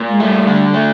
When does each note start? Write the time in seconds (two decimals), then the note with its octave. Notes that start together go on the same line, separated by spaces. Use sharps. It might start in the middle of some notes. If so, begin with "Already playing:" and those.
Already playing: A#2
0.08 G#3
0.20 G3 A3
0.47 D3
0.74 A3